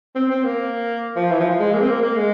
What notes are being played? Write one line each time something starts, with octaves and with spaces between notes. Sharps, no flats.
C4
C4
A#3
F3
E3
F3
F3
G#3
A#3
C4
A#3
A#3
G#3